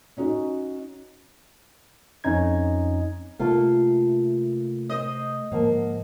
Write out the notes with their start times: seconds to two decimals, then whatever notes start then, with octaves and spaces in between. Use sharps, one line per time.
0.17 C#4 D#4 F#4
2.24 F2 C#4 D#4 G#6
3.39 C3 A3 A#3 F4 A4
4.89 C5 D#5
5.52 G#2 D3 F3 A#3